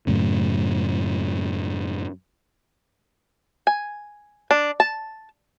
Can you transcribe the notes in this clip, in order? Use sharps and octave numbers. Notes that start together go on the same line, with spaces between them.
F#2 A2 C#3
G#5
D4
A5